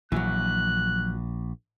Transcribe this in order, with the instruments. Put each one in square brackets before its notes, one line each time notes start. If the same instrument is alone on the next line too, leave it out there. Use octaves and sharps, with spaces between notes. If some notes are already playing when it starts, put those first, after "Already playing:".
[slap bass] A#1 A#2 [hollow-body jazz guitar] E3 F#3 [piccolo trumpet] F#6